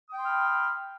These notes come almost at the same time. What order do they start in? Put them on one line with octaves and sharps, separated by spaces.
D#6 G5 C6 F6 B5